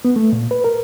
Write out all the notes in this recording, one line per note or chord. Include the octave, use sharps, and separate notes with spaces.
B3
A3
A#2
B4
A#4